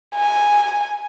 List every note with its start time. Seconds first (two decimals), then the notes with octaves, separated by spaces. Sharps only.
0.16 G#5